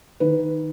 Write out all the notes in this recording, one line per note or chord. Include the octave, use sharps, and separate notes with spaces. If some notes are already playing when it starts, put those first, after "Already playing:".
D#3 B4